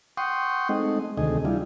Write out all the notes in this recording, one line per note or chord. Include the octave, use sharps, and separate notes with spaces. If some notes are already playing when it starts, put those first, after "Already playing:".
F#5 G5 C6 C#6 D#6
G#3 A3 C4 D#4 D#5
D2 C3 D#3 A3 G#4 D#5
G3 D4 E4 F4